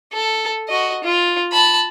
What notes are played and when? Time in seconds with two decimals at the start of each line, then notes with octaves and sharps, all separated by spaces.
0.13 A4
0.69 F#4 D#5
1.03 F4
1.52 A5 B5